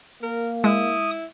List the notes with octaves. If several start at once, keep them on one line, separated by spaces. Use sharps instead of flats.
A#3 A#4
G#3 E4 D#6